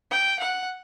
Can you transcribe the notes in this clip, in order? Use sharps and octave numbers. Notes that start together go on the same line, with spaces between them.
G5
F#5